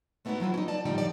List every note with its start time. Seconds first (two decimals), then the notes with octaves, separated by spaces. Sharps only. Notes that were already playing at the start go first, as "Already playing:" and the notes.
0.25 G#3 A3 B3 D#4 E4 F#4
0.40 F3 F#3 E4 F4
0.54 C#4 D#4
0.68 D5 A5
0.85 A2 D3 F3 G3 D#4 G5
0.98 F2 E3 F3 D5